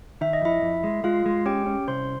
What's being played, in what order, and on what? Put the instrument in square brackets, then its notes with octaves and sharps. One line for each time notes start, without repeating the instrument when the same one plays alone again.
[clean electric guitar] D#3 [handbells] E5
[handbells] D#5
[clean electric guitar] F2 [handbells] E4 E5
[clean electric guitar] F2
G#3
[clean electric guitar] G#3 [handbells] F4 F5
[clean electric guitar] G#3
[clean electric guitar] C#4 [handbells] G4 G5
[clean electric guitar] C#4
[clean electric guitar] C2 [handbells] C5 C6